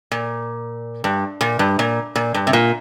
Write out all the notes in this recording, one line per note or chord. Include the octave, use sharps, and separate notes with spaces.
A#2
G2
A#2
G2
A#2
A#2
G2
C3
A#2